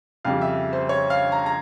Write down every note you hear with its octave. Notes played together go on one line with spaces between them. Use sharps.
F2 C#3 G3 F5
E5
C5
C#5
F5
A#5
A#5